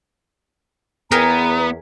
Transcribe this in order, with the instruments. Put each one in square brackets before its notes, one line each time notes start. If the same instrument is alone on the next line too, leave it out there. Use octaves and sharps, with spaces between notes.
[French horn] E2 [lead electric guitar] B3 [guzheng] G#4 A#4 G5 [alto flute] A#5